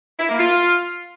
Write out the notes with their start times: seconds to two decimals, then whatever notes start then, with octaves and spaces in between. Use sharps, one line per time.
0.19 E4
0.29 A#3
0.39 F4